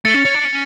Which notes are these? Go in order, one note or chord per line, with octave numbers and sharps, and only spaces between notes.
A3 A6 C#7
C#4
C#4
D4
C#4